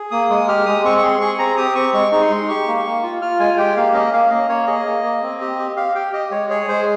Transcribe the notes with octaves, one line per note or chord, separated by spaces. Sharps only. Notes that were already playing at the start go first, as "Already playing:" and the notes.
Already playing: G#4
A#3 D#6
G#3 D#6
G4 F6
G#3 D#6
C4 C#6
C#6
G#4 C6
G#4 C#6
C4 A#5
G4 D#6
C4 C#6
G#3 C#6
D#4 C#6
C6
G#3
G4 C#6
A#3
A#3
F4
F4 F6
G#3 G#5
G4 G5
A#3 F5
C#4 D#5
A#3 F5
A#3 D#5
A#3 C#5
G#4 D#5
A#3
A#3
C4
G4
G4
G4 F5
G4 G5
G4 D#5
G#3 C#5
G#4 C#5
G#3 C5